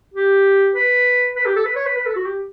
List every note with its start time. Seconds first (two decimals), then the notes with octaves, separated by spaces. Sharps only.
0.14 G4
0.75 B4
1.36 B4
1.45 G4
1.56 A4
1.65 B4
1.76 C#5
1.86 B4
1.97 B4
2.06 A4
2.16 F#4
2.26 G4